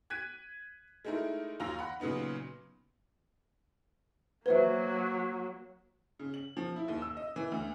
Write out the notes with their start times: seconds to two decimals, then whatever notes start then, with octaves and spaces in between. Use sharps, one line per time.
0.10 F#6 G#6 B6 D#7
1.05 G#3 A3 D#4 E4 A#4
1.60 D#2 F4 A#5 E6 A#6
1.79 F#5 B5
2.00 A#2 C#3 F#3 B3 D#4
4.46 F#3 A#3 B4 C5 E5
6.20 C#3
6.34 F#7
6.57 F3
6.76 E4
6.88 D#2
7.02 E6
7.17 D#5
7.36 E3
7.52 D2